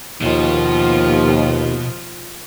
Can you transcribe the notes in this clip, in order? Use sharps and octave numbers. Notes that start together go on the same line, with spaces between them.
D#2 B2 F3 F4